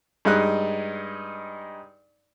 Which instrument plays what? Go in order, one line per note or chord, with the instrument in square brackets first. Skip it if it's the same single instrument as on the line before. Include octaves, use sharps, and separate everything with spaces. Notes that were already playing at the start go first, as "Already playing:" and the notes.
[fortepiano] G2 G#3 D#4 F#6